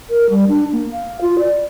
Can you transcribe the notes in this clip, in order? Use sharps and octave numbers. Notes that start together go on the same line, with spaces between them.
A#4
G3
D4
A#3
F5
F4
D5